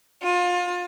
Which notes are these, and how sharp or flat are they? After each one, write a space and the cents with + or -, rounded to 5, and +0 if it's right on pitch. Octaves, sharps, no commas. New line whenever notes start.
F4 +30